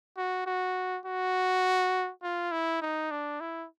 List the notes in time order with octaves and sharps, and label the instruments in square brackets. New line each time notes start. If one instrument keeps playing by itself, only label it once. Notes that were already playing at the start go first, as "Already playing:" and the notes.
[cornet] F#4
F#4
F#4
F4
E4
D#4
D4
E4